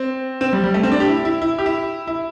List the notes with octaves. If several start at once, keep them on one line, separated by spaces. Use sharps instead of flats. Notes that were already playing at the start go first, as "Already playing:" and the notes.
Already playing: C4
C4
G3
G3
A3
C4
D4
G4
E4
E4
E4
G4
E4
E4